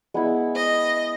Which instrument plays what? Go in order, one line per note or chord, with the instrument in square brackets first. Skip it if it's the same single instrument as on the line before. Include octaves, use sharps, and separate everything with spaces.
[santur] G#3 B3 E4
[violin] D#5